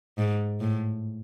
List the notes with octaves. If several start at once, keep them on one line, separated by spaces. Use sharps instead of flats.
G#2
A2